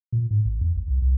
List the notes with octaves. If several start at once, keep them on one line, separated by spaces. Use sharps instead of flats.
A#2
G#2
A1
E2
G#1
C2
C2